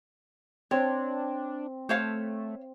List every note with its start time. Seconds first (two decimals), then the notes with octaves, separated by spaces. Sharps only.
0.71 C4 D4 C#5
1.89 A3 C5 C#5 F5